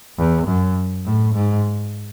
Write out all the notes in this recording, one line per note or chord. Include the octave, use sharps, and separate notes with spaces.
E2
F#2
A2
G#2